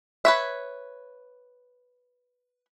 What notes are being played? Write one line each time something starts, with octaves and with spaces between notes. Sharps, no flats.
B4 C#5 E5